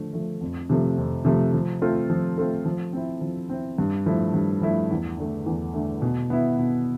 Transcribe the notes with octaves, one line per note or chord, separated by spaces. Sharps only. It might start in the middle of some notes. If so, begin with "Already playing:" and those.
Already playing: D3 F3 A3
F3 A3
F2
C3 F3 A3
F2
C3 F3 A3
F3
A3 C4 F4 A4
F3
A3 C4 F4 A4
F3
C4 E4
F3
C4 E4
G2
F3 A3 E4
G2
F3 A3 E4
E2
D3 A3
E2
D3 A3
B2
B3 E4
B2